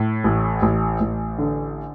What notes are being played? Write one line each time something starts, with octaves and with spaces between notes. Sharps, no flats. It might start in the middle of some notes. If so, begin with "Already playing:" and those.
Already playing: A2
A1
A1
A1
D3